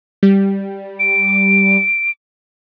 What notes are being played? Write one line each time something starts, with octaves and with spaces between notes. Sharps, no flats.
G3
D7